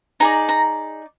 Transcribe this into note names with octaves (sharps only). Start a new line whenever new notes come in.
D#4 G#4 D5 A#5
A#5